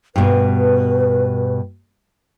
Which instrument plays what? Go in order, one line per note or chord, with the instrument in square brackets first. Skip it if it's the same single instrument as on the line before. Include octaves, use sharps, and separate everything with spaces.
[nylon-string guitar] G2 B2 [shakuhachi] B4